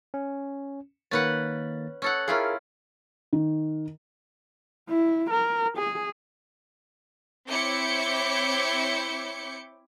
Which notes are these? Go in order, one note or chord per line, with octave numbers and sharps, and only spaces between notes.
C#4
D#3 A#3 C#4 B4 F#5 A6
C#4 A4 F#5
C#4 E4 F4 G#4 A#4
D#3
E4
A#4
G#4
C4 E4 C#5 D6 G6 C#7